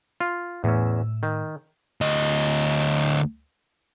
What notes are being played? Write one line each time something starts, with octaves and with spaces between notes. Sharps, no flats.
F4
E2 A2 C#4 E6
D#3
D2 D#5